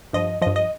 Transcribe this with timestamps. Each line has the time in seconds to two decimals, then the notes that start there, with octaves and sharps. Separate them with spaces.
0.13 G2 F3 D#5
0.41 G2 F3 D#5
0.56 D#5